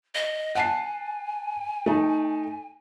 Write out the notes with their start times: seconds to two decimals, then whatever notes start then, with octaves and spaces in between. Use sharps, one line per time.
0.15 D#5
0.55 F#5 G#5 A5 C7
1.86 A3 D#4